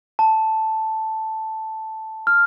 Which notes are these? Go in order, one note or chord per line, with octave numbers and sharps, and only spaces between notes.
A5
F6